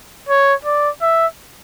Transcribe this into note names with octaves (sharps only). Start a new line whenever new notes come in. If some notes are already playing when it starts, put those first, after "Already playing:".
C#5
D5
E5